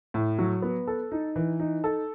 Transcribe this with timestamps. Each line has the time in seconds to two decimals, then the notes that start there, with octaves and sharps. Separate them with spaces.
0.14 A2
0.39 F#3
0.62 B3
0.87 A4
1.12 D#4
1.36 E3
1.60 D#4
1.84 A4